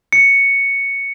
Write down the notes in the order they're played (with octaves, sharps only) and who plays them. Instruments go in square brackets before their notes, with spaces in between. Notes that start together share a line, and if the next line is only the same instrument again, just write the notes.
[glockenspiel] C#7